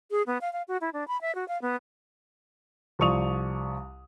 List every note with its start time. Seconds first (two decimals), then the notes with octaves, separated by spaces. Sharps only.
0.11 G#4
0.27 B3
0.41 F5
0.53 F5
0.68 F#4
0.81 E4
0.93 D4
1.08 B5
1.21 E5
1.35 F#4
1.48 F5
1.62 B3
2.99 C2 F3 D5 C#6 D#6 F7